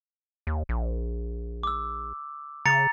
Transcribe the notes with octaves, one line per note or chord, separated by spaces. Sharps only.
D#2
A#1
D6 E6
C#3 A#5 A6 C#7